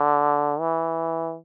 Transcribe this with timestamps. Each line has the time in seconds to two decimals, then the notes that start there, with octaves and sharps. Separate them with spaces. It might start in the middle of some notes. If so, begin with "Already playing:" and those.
Already playing: D3
0.60 E3